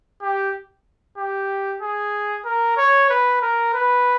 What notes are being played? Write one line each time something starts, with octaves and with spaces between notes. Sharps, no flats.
G4
G4
G#4
A#4
C#5
B4
A#4
B4